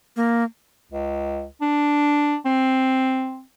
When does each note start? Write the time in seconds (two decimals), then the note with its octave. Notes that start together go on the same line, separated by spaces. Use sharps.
0.16 A#3
0.91 C#2
1.62 D4
2.46 C4